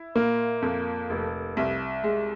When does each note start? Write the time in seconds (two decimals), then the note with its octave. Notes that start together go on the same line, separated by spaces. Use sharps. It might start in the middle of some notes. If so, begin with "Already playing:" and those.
Already playing: E4
0.15 A#2 A#3
0.62 F2
1.10 F1
1.57 C2
2.04 G#3